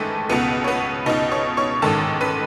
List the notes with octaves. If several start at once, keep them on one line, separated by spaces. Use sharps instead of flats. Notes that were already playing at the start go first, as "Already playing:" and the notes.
Already playing: A1 G#2 D#3 G#3 A3 G#4 A4 B4
C#2 B2 B3 B4
C#5
B3 B4
C#2 B2 D#4 D#5
C#5 C#6
C#5 C#6
A1 G#2 D#3 A4 A5
B4 B5